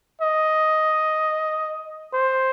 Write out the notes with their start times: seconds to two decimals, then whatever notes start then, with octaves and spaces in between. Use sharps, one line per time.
0.21 D#5
2.13 C5